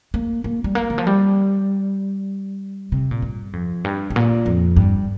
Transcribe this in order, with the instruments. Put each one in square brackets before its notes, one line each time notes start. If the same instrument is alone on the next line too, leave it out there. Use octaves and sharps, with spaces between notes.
[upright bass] A#3
A#3
G3
A#3
D#3
F3
G3
C3
A#2
G2
F2
G2
G2
A#2
F2
G2